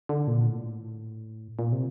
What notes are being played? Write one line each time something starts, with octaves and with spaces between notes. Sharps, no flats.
D3
A#2
A2
A#2
C3